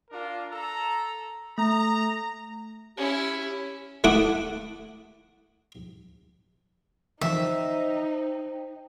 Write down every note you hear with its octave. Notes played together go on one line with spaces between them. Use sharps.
D4 F4 A#4
A4 A#5
A3 A#5
C#4 E4 G4
A3 E4 F#5 D6 D#6
D3 E3 F3 D#4 C5 E5 G5